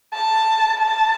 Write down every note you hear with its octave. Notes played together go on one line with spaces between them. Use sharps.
A5
A5